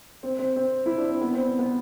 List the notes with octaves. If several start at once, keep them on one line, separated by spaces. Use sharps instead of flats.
C4
C4
C4
E4
D4
C4
B3
C4
C4
B3